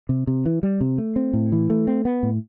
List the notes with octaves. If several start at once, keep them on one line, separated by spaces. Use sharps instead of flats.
C3
C3
E3
G3
C3
A3
C4
A2
E3
A3
C4
B3
A2